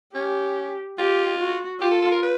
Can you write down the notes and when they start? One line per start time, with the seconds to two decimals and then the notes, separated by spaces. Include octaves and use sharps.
0.15 C#4 G4
0.98 F4 G4
1.39 F#4
1.81 F4 G4
1.91 A4
2.02 A4
2.12 A#4
2.23 B4